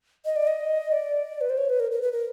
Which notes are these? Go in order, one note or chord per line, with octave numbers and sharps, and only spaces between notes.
D#5
D5
D#5
D5
B4
C5
C#5
B4
A#4
A#4
B4
A#4